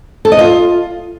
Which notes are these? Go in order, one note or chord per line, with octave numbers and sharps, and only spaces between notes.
A4
D#5
F4